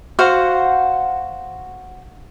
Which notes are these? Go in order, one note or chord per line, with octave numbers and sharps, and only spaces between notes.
F#4 C5 F5 F#5